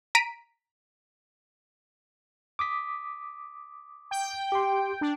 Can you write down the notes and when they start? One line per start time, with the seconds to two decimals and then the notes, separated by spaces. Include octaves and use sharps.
0.15 A#5 B6 D7 D#7
2.59 D6 D#6 B6
4.11 G5
4.52 G4 C6
5.01 D4